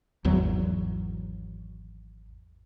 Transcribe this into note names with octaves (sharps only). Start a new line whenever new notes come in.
G#1 E2 F#3